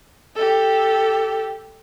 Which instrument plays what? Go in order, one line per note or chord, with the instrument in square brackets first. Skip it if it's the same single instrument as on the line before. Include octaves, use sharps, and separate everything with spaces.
[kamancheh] G4 A4